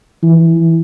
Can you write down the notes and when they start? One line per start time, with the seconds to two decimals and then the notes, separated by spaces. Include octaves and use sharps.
0.22 E3